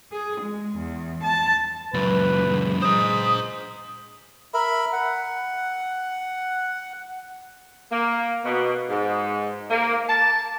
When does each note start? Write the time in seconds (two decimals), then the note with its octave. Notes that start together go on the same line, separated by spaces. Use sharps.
0.12 G#4
0.40 G#3
0.76 E2
1.23 A5
1.94 C#2 F#2 B4
2.82 G#3 C5 A#5 D#6
4.54 A#4 E5 B5
4.93 F#5
7.92 A#3
8.45 B2
8.89 G#2
9.70 A#3
10.08 A5